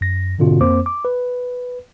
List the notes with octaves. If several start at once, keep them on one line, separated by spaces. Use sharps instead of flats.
F#2 A#6
G#2 B2 D3 C4 F4 F#4
F2 A#3 C4 C5 D6
D6
B4